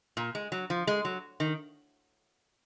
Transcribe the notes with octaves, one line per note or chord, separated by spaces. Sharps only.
A#2
G#3
F#3
F3
G#3
F#3
D#3